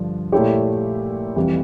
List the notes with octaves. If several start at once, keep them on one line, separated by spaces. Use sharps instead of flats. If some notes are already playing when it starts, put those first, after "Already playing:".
Already playing: G2 D3 F3
A#2 A3 E4 G4 C#5
F1 F2 E3 G3